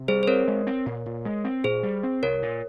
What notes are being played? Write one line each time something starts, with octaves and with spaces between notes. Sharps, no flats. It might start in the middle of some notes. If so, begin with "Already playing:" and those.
Already playing: C3
G3 G#4 C5
C5
C4 A#4 C#5
G#3
C4
A#2
A#2
G#3
C4
A#2 G#4 C5
G3
C4
C2 A#4 C#5
A#2